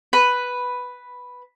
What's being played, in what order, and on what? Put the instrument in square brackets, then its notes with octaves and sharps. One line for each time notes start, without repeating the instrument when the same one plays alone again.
[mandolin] B4